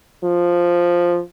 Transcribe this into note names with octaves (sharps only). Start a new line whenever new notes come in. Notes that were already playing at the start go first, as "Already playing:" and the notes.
F3